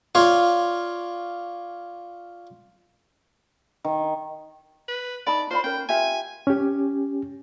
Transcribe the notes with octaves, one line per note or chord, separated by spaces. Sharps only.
F4 C#5 D5 F5
D#3
B4
D#4 D5 A5 B5
F4 C5 D5 B5
C#4 A#4 G5
F4 G4 E5 G#5
C#4 G4